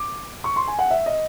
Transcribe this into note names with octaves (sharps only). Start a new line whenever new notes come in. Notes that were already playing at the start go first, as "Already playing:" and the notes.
Already playing: D6
C#6
C6
G#5
F#5
E5
D#5